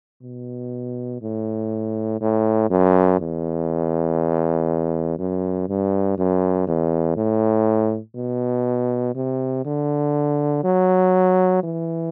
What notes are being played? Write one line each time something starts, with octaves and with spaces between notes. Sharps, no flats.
B2
A2
A2
F#2
E2
F#2
G2
F#2
E2
A2
B2
C3
D3
F#3
E3